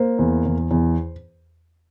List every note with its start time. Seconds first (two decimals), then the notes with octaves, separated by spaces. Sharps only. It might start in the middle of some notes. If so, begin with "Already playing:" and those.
Already playing: A#3 C5
0.19 E2
0.45 E2
0.71 E2